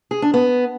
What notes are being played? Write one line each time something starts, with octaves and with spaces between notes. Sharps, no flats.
G#4
D4
B3